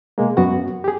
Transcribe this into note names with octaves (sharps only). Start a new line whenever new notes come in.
B2 G#3 A#3
F#2 B3 F#4 F#5
G4 G#4